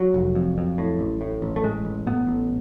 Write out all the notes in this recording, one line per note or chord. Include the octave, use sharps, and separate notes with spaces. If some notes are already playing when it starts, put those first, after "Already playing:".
Already playing: F#3
F1
F2
F2
A2
A1
A2
A1
A3
A2 G#3
A1
A2 B3
A1